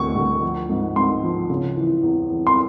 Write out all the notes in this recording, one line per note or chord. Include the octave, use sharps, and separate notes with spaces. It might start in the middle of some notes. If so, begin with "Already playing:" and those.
Already playing: D2 E3 C#6
D2
F3
G#2
G#2 C6
F3
C#3
E3
E2
E2
C6